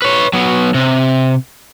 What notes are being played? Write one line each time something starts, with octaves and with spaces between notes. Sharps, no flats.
B4 C#5
F#3 B3
C3